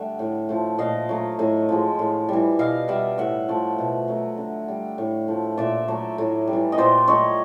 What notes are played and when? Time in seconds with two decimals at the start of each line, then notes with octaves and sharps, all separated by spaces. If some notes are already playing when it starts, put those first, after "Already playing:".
Already playing: D3 G3 A3 E5 F#5
0.19 A2
0.49 F3 A3
0.78 A#2 D#5 F5
1.09 F#3 A3
1.39 A2
1.69 F3 G#3
1.99 A2
2.29 E3 G3
2.59 B2 D#5 F5
2.88 G3 E5 F#5
3.18 A2 E5 F#5
3.48 F3 A3
3.78 B2
4.08 F#3 A3
4.38 D3
4.68 G3
4.98 A2
5.28 F3 A3
5.57 A#2 D5 E5
5.88 F#3 A3
6.18 A2
6.47 G3
6.53 E3
6.72 D#5
6.78 A#2 C5 D5
7.08 F#3 A3 C#5 D#5